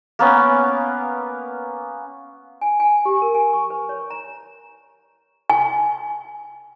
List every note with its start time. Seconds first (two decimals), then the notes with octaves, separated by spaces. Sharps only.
0.19 A#3 B3 C#4
2.61 G#5
2.80 G#5
3.05 G4
3.22 A#4
3.35 G#5
3.53 C#6
3.70 B4
3.89 C#5
4.10 A#5
5.50 G#5